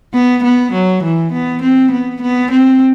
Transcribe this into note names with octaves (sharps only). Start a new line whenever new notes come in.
B3
B3
F#3
E3
B3
C4
B3
B3
C4